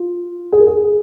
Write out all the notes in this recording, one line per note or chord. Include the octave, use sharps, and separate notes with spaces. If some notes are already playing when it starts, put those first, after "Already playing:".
Already playing: F4
G#4
A#4
G#4